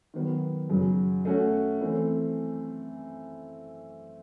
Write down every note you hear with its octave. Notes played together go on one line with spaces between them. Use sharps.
D#3 F#3 B3
F#2 C#3 F#3
A3 C#4 F#4
E3 A3 C4